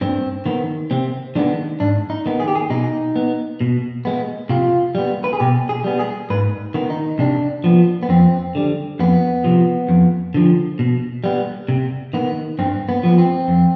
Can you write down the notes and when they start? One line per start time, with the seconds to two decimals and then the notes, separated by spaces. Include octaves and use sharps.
0.01 G2 C4
0.46 D#3 B3
0.91 C3 C4
1.35 D#3 G#3 B3 D4
1.80 G#2 D4
2.10 D#4
2.26 D#3 B3
2.40 G#4
2.48 G4
2.55 G#4
2.70 B2 D#4
3.16 B3
3.61 B2
4.05 G#3 B3
4.49 C3 F4
4.95 G3 B3
5.24 B4
5.33 G#4
5.40 B2 G4
5.69 G#4
5.84 G3 B3
5.99 G#4
6.30 G#2 B4
6.74 D#3 B3
6.90 D#4
7.19 C3 D4
7.64 F3 B3
8.03 B3
8.09 F2 C4
8.55 D3 G3
8.99 F2 B3
9.44 C3 F3
9.89 F2
10.34 D3 F3
10.79 B2
11.24 G3 B3
11.68 C3
12.13 D#3 B3
12.59 G2 C4
12.89 B3
13.03 F3 B3
13.19 C4
13.48 F2